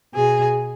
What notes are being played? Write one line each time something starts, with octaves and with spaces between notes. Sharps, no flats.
B2 G#4